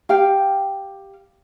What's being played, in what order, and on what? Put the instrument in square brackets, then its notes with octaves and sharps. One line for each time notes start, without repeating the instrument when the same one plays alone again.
[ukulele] G4 F5 G5